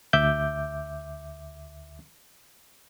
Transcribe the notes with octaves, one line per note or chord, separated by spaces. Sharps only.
D2 E5 D6 G6